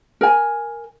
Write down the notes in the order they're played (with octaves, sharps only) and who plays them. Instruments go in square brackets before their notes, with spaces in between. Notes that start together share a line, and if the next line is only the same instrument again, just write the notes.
[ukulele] A#4 G#5